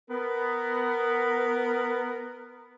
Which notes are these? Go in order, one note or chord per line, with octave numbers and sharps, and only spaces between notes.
B3 A#4